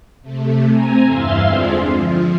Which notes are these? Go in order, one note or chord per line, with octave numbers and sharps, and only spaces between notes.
C3 A3
C4 G#5 A#5
E2 G2 E4 E5 F5 C6
D3 G#3 C4 D4 F4 G#4
F3